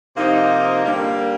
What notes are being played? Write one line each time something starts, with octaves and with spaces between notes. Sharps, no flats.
C3 F3 A#3 D#4
D3 G3 A#3